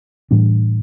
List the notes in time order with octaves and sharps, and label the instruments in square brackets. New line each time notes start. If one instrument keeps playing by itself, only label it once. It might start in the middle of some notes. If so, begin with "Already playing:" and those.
[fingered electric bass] A2 E3 G3 D4